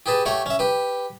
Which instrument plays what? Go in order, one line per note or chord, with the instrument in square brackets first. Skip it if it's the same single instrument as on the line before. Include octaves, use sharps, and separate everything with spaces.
[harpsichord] G4 G#4 B4 A5
A3 G4 C#5 F#5
C#4 E5
G4 B4